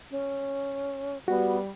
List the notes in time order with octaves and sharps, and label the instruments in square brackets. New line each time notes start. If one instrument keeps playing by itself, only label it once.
[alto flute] C#4
[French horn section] G3 [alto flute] B3 [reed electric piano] F#4